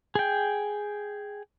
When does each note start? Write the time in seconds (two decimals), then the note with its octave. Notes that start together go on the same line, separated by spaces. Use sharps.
0.15 G#4 G5